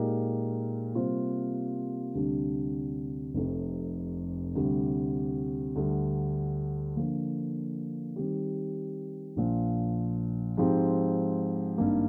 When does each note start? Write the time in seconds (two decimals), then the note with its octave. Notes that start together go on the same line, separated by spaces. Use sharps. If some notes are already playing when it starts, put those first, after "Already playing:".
Already playing: A#2 G#3 D#4 G4 A#4
0.94 C3 G3 A#3 F4 C5
2.15 D2 C3 G3 D4
3.34 F1 F2 C3
4.55 D2 C3 G3
5.76 D2 D3 G3
6.96 D3 F3 A#3
8.16 D#3 G3 C4 G4
9.36 A#1 A#2 F3
10.57 G#2 F3 G#3 C4 G4
11.78 G#1 G2 D#3 G3 A#3